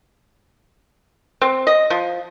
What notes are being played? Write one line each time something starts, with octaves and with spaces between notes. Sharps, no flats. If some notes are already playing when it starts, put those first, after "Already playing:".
C4
D#5
F3